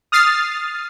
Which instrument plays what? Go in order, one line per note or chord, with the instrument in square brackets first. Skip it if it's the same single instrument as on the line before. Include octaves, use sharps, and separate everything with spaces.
[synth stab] D#6 F6 A6 C7